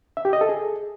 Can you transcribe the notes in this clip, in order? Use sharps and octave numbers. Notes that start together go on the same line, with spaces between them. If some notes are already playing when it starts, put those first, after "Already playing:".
E5
G4
D#5
A4
G#4